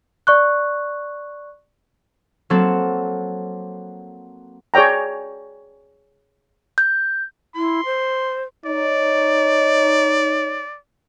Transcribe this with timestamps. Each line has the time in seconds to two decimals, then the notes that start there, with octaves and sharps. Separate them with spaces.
0.27 D5 C#6 F#6
2.50 F#3 A#3 C4 A4 F#5
4.74 G#4 C#5 D5 G5 A#5
6.78 G6
7.56 E4 C6
7.85 C5
8.66 D#4 C#5 D5